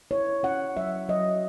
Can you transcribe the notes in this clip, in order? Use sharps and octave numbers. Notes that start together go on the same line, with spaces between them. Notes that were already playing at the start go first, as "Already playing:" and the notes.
E4 C#5
C#4 F#5
F#3 E5
F#3 D#5